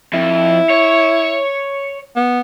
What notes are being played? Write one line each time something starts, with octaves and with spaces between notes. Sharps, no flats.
F2 E4
C#5
B3